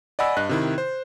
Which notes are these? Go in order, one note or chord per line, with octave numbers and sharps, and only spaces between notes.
D5 D#5 F#5 G#5 B5 E6
G2 D#5 F#6
C3 D#3 E4
C5